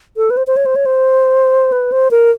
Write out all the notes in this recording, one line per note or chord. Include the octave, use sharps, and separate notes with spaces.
A4
B4
C5
C5
C#5
C5
C#5
C5
B4
C5
A#4